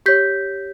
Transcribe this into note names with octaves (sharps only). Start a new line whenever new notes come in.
G4 C#5 G6 B6